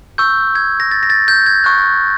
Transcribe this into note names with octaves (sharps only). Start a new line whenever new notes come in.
C#6 E6 G6
G#6
A#6
A6
A#6
A6
G6
G#6
C#6 F#6